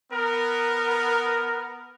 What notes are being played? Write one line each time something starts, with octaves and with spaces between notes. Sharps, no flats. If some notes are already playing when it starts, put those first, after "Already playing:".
B3 A#4